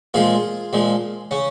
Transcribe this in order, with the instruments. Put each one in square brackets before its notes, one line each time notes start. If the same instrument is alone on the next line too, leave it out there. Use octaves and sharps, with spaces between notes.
[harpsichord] A#2 F3 G#3 F4 G#4
A#2 F3 G#3
C#3 C#4